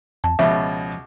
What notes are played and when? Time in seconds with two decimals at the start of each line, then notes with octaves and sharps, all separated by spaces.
0.24 F2 A5
0.39 C#2 B2 F3 E5